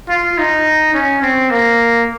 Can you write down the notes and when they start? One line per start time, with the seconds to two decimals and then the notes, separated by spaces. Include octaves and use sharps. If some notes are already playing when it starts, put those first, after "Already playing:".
0.09 F4
0.38 D#4
0.94 C#4
1.22 C4
1.50 A#3